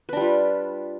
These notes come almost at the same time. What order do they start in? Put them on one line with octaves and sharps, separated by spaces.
B4 D4 G3 F4